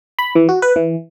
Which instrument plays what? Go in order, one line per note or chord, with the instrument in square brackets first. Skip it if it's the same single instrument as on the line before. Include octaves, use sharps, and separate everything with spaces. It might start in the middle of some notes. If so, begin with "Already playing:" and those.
[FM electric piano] B5
E3
F#4
B4
E3